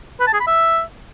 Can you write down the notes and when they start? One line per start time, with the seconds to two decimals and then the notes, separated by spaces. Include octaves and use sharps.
0.20 B4
0.27 A5
0.34 G#4
0.40 B5
0.47 E5